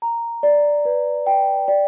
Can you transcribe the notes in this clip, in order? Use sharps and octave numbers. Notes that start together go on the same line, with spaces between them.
A#5
D5
B4
G5
D5